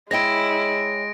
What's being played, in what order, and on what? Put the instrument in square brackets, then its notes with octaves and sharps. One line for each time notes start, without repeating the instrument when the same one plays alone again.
[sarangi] G#3 [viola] E4 [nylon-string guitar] C#5 D#5 G5 [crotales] A#6 D7